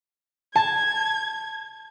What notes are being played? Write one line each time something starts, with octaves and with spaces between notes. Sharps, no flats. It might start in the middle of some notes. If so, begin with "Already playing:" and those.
A5 G#6